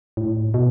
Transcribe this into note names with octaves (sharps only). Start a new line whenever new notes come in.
A2
B2